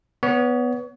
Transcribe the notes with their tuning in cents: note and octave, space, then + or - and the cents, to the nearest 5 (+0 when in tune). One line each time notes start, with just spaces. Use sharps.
B3 +0 C#5 +30